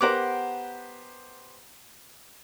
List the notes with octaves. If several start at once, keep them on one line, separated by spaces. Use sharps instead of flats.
B3 G4 A#4 C5 F#5 D6